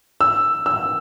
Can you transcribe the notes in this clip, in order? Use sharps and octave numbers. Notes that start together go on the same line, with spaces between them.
E6
E6